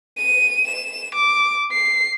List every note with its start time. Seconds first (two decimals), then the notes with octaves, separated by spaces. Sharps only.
0.17 D#7
0.67 E7
1.15 D6
1.72 C7